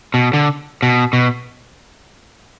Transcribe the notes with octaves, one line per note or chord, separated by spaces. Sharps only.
B2
D3
B2
B2